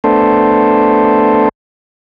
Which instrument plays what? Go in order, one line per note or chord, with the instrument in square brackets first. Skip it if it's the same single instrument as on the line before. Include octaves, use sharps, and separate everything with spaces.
[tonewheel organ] A3 B3 D4 A4 C5